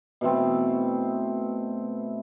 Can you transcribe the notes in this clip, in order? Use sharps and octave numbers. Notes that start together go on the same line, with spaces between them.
B2 E3 A3 C4